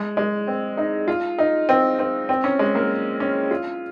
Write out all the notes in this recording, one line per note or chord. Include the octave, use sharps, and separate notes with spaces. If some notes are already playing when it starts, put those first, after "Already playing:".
Already playing: G#3
G#3
C4
D#4
F4
D#4
C4
C4
C4
C#4
G#3
A#3
C#4
F4